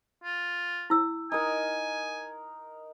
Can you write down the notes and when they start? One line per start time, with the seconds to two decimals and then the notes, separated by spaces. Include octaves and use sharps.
0.24 F4
0.90 E4 E6
1.32 D#4 A#4 G#5